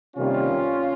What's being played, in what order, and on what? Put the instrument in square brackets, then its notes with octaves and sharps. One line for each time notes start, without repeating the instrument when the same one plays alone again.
[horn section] C3 D#3 G3 A#3 C#4 F4